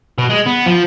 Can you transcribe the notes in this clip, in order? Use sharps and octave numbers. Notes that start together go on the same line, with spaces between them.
B2
G#3
B3
F3